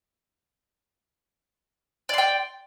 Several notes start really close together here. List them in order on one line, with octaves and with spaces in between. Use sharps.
D5 C6 G5